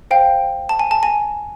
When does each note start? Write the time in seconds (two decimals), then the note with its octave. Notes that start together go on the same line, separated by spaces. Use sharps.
0.11 C5 F5 G5
0.69 A5
0.79 G#5
0.91 A5
1.03 G#5